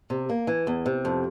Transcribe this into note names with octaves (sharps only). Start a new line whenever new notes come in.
C3
A#3
E3
E2
C3
F2